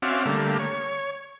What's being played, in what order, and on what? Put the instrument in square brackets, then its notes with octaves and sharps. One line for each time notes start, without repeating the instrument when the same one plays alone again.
[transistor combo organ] C4 C#4 F#4 D5 E5 F5
D3 G3 A3 A#3
C#5